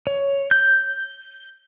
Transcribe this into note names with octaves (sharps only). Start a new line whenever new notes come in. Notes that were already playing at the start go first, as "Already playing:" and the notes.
C#5
G6